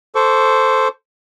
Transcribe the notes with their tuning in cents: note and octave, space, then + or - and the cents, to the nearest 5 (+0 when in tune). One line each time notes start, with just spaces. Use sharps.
A4 +0 C5 +0 C#6 +30